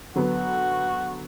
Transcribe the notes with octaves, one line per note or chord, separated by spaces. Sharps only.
D3 F#3 B3 F#4